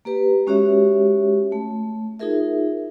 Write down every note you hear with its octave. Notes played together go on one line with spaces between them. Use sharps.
A#3 G4 B4
G#3 C#4 F#4 G4 C#5 E5
A3
D#4 F4 G#4 A#4 E5